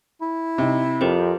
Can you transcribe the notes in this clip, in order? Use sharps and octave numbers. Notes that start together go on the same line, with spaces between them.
E4
C3 D#4
F2 C4 G4 A#4 C5